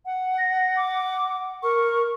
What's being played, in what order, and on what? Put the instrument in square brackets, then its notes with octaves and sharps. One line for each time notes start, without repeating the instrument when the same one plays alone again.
[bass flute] F#5
[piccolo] A#6
D6
[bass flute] A#4 [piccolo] C#6